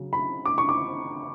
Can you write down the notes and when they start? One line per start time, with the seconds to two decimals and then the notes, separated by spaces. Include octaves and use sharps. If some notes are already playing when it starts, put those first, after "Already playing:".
Already playing: C#3 F#3
0.13 B5
0.46 D6
0.58 C#6
0.69 D6